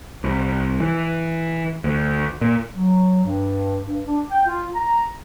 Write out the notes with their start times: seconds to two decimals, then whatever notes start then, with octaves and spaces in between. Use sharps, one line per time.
0.24 C2
0.80 E3
1.84 D2
2.41 A#2
2.74 F#3
3.25 G2
3.86 G2
4.06 D4
4.31 G5
4.46 F4
4.75 A#5